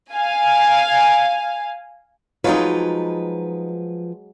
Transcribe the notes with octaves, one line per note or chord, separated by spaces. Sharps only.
F5 G#5
F3 F#3 G#3 D#4 F4 B4